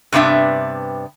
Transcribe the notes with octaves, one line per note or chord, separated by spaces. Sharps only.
G2 C3 B3 D4 E5